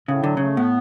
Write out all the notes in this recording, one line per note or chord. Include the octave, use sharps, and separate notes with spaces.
A2 C#3
D3 F#3
C#3 A3
A2 B3